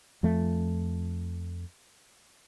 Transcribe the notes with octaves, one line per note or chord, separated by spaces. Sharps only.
F2 F3 A3